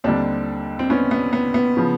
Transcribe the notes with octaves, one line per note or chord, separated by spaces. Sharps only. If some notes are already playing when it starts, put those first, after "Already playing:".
D#2 D3 G3 C4 D4
C4
B3 C#4
B3
B3
B3
C#3 F3